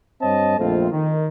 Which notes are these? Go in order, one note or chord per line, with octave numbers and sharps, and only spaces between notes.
G2 C4 C#5 D#5 A5
A#1 F2 A3 C4 F4
D#3